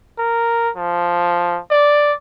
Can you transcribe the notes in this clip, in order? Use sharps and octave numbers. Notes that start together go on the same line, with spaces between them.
A#4
F3
D5